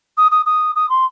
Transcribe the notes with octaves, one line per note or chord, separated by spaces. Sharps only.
D#6
D#6
D#6
D#6
C6